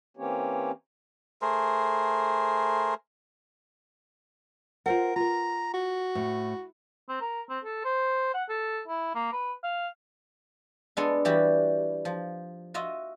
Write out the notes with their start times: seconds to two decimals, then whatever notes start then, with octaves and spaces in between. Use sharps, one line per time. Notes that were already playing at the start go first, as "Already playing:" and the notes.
0.17 E3 A#3 C4 C#4 G4 C#5
1.42 A3 G#4 A#4 C5
4.86 F4 A#4 C5 F#5
5.16 F4 A#4 A#5
5.74 F#4
6.15 A2
7.09 C4
7.21 A#4
7.49 C4
7.64 A4
7.84 C5
8.34 F#5
8.49 A4
8.88 E4
9.15 A#3
9.33 B4
9.64 F5
10.97 G#3 B3 D4 G#4 A4
11.25 E3 G3 F#4 G4 D5
12.05 F3
12.74 F4 F#4 D#5 E5